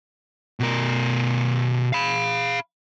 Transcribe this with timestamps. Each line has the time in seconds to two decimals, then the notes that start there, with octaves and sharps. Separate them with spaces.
0.60 B2 A#4
1.93 F5 B5